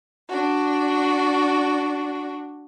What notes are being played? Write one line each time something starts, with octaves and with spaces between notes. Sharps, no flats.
D4 F#4